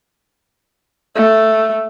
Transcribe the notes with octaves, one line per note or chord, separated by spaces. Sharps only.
A3